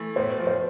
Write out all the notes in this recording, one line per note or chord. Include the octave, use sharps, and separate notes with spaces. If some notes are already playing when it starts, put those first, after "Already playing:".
Already playing: E3 A3
A2 C5
F3
C5